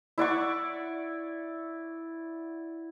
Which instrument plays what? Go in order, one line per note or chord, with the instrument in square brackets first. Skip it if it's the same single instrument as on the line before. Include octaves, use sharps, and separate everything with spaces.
[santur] E4 D5 F#5 C#6